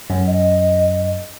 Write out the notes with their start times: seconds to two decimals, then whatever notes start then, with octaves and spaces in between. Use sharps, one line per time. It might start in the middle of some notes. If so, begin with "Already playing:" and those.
0.10 F#2
0.27 D#5